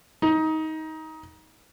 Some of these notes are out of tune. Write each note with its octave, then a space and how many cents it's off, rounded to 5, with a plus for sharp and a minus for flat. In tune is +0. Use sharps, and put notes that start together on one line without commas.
D#4 +20